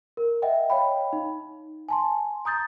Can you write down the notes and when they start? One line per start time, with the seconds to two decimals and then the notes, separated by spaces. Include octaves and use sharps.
0.17 A#4
0.42 D#5 E5 F#5 G5
0.70 C#5 D#5 F5 G5 B5
1.13 D#4
1.89 G#5 A5 C6
2.45 A#5 D#6 G6 A6